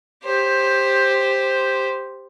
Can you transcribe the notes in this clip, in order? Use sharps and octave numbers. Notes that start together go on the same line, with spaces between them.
G4 C5